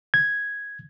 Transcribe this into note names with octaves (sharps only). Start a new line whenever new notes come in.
G#6